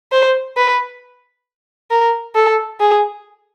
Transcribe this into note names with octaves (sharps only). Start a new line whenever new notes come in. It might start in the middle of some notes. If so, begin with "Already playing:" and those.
C5
B4
A#4
A4
G#4